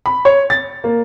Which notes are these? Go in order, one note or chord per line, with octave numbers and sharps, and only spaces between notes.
B5
C#5
A6
A#3